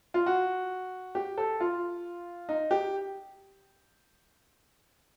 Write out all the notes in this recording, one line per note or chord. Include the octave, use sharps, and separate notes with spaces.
F4
F#4
G4
A4
F4
D#4
G4